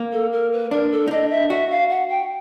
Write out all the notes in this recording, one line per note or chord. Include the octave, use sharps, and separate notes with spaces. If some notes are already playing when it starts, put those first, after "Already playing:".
Already playing: A#3
A4
A#4
B4
D4 A#4
A4
D#4
D4 D#5
E5
F#4 E5
F5
F#5
G5